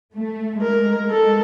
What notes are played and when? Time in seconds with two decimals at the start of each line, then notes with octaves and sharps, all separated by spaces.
0.14 A3
0.62 G#3 A#4
1.11 A4